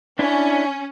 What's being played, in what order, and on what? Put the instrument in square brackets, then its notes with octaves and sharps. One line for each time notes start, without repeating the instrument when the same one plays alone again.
[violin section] C#4 [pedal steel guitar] D4 E4